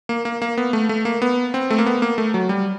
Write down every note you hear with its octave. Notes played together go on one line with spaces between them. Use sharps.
A#3
A#3
A#3
B3
A3
A3
A#3
B3
C4
A3
A#3
B3
A#3
A3
F#3
G3